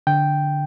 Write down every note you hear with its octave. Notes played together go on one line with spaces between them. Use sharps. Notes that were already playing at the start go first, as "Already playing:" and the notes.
D3 G5